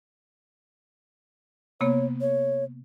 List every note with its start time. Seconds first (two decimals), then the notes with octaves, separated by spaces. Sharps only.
1.81 C3 A#3 B3 C#5
2.21 C#5